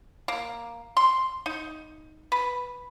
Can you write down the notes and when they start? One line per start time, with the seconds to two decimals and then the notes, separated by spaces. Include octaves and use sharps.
0.28 A#3
0.97 C6
1.46 D#4
2.32 B4